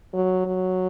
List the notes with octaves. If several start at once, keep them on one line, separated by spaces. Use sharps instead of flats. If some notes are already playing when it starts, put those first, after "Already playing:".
F#3
F#3